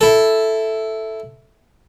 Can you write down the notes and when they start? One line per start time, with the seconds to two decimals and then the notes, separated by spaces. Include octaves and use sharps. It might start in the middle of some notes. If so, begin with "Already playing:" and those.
0.01 E4 A4